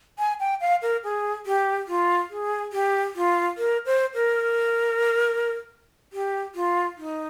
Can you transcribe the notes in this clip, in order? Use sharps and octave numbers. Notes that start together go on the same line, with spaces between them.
G#5
G5
F5
A#4
G#4
G4
F4
G#4
G4
F4
A#4
C5
A#4
G4
F4
D#4